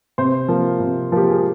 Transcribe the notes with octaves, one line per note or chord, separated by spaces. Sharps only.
C3 C5
F3 A#3
C3
F3 A#3 G4
G#4